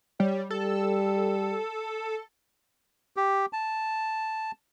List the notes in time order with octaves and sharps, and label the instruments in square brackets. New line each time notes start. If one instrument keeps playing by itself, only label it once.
[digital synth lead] G3 [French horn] C#5
[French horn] G3 [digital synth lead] A4
[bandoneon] G4
A5